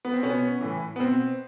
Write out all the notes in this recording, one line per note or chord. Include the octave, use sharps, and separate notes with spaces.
B3
C4
B2 B3 C#4
A2 E3
B3
B2 C4